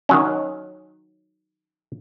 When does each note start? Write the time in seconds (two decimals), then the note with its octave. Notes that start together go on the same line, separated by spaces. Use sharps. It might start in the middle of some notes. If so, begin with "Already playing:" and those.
0.09 D#3 F#3 C#4